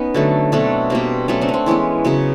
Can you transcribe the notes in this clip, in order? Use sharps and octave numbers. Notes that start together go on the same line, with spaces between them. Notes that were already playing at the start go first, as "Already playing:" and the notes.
Already playing: B3 C#4 D#4
D3 F#3 A3
B2 F#3 A3 C4 D4
B2 G3 A#3 C4
B2 F#3 A3 C#4
C4 D4
C#4
C4
E3 G#3 B3 C#4
C#3 F#3 B3